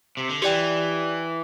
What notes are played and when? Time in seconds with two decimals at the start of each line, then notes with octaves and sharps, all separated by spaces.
0.17 C3
0.29 D3
0.42 E3 G4 D5 G5